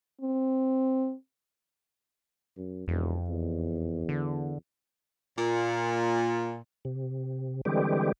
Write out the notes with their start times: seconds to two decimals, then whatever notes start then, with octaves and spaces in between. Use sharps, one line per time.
0.21 C4
2.57 F#2
2.88 E1 F2
3.29 E2
4.09 D3
5.38 A#2
6.85 C3
7.65 D3 E3 G3 G#3 C4 G4